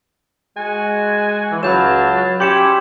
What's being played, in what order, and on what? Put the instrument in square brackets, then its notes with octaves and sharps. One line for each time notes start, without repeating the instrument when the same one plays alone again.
[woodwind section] G#3 F#4 [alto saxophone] G#5
[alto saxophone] E3
[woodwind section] C#2 F5 A5 [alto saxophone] F#3 [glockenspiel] B5 G6 E7
[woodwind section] G3 C#4 E4 [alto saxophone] G4 [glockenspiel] C6 C#7 E7